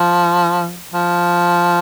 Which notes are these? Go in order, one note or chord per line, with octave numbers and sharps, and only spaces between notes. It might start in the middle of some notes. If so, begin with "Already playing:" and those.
Already playing: F3
F3